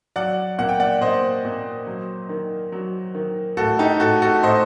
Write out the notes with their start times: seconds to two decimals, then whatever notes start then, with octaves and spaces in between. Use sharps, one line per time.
0.16 F#3 D5 F#5
0.59 A#2 F#5
0.69 G5
0.80 D5 F#5
1.01 A#2 C5 D#5
1.45 A#2
1.87 F#3
2.29 D#3
2.72 F#3
3.15 D#3
3.57 A2 F#4 A4
3.79 D#4 G4
4.00 A2 F#4 A4
4.22 F#4 A4
4.43 A2 C5 D#5